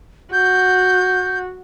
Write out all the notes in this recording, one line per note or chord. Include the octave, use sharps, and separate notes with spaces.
F#4 G6